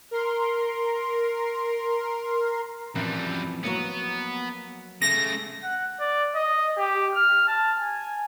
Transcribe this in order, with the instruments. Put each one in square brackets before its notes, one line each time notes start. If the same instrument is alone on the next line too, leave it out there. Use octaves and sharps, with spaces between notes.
[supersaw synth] A#4 C6
[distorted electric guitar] F#2 G3 [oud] E3 F3 C4
[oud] F#3 A#3 F#4 [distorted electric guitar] B3
[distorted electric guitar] C#3 A3 [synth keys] A#6
[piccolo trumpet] F#5
D5
D#5
G4
F6
A5
G#5